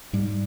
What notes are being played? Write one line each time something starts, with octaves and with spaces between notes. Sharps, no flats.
G#2 G3